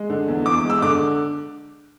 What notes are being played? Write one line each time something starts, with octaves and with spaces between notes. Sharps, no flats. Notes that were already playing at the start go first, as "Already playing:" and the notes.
Already playing: G#3
D3
E2
E2 D6
G#3
E6
D3 D6